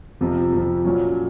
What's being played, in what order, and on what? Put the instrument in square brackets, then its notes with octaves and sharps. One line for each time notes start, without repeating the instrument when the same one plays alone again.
[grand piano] F2 C3 F3
F2 C3 F3
A#2 F#3 C#4